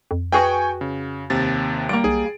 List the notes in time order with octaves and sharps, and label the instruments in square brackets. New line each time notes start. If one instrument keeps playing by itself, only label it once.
[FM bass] F2
[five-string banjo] F#4 G#4 B4 [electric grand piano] G5 G#5 C#6
[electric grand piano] C#3
D#2 C3 A6
[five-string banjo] G3 A#3 [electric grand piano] D7
[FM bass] B1 [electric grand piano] G#4